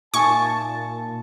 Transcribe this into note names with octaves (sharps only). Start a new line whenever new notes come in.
A#2 D#4 E5 G#5 A5 C#6